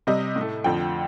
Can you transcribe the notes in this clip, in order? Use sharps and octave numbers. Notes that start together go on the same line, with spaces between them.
C3 G3 D#5
A2
A3
F2 D3 F3 G5